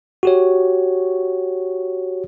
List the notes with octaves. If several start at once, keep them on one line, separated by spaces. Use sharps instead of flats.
F#4 G4 C#5